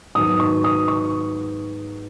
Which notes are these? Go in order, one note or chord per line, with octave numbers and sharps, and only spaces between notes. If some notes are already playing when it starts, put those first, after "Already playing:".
G#2 D#3 F#3 B3 D#6
C#6
D#6
C#6